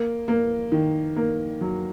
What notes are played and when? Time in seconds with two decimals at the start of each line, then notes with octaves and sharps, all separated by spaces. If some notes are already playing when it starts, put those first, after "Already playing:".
Already playing: A#3
0.28 A#3
0.72 D#3
1.16 A#3
1.61 F#3